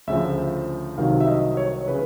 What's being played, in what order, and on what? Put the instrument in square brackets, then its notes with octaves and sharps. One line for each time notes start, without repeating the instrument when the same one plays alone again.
[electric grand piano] D2 C#3 F3 E5
C2 C3 D#3 F#3 F5
E5
D#5
C#5
C#3 E3 B4